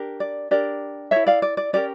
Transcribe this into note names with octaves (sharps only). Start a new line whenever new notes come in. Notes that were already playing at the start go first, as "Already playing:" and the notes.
Already playing: D4 G4 A#4
D5
D4 G4 A#4 D5
E4 A4 C#5 E5
D5 F5
D5
D5
C#4 G4 A#4 D5